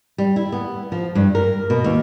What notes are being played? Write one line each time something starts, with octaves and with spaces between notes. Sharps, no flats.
G3
E4
B3
F3
G2
A#4
B2
D#2